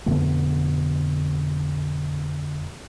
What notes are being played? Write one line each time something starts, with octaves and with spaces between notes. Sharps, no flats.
F2 B2 D3 A3